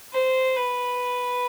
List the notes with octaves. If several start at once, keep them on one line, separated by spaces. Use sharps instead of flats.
C5
B4